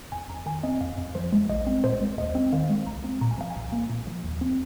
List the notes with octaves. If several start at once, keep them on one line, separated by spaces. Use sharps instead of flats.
F2 G#5
F2 A#5
D#3 G#5
C4 D#5
F2 F5
F2
F3 C5
G#3
A#1 D#5
C4
A#2 C5
G#3
D#2 D#5
C4
D#3 F5
G#3
C2 A#5
C4
A#2 A#5
G#5
F3 F5
G#5
C2
A#3
A#2
F3
D#2
C4